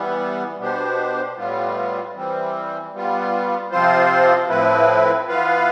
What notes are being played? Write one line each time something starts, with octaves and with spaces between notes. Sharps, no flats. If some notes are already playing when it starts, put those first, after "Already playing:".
Already playing: E3 G3 B3
B2 B3 D4 G4 C5
A2 G3 B3 F4
E3 G3 C4
G3 B3 F4
C3 F3 C4 F4 C5
A2 F3 C4 E4 B4
E3 B3 F4 B4 F5